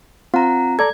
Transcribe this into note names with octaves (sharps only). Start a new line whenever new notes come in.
C4 F4 F#5 A#5
A4 D5 A#5 G#6